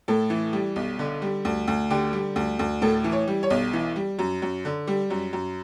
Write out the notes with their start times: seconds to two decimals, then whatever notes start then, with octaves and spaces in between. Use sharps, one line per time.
0.08 A2 A4
0.30 E3
0.53 G3
0.76 B1
0.99 D3
1.22 G3
1.45 D2
1.68 D2
1.90 D3 G4
2.13 G3
2.36 D2
2.59 D2
2.82 A2 A4
3.04 E3
3.12 C#5
3.28 G3
3.43 C#5
3.50 B1
3.73 E3
3.96 G3
4.19 F#2
4.42 F#2
4.65 D3
4.87 G3
5.10 F#2
5.33 F#2